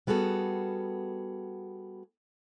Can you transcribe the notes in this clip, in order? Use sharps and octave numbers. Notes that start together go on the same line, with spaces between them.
G3 B3 F#4 G#4 A4